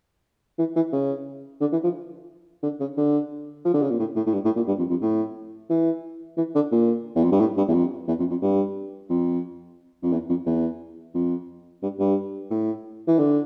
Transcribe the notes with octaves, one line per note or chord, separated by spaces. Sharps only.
E3
E3
C#3
D3
E3
F3
D3
C#3
D3
F3
D3
C#3
A#2
A2
A2
A2
G2
A2
A#2
G2
F2
F2
A2
E3
E3
D3
A#2
E2
F2
G2
A2
G2
E2
F2
E2
F2
F2
G2
F2
F2
E2
F2
E2
F2
G2
G2
A2
E3
D3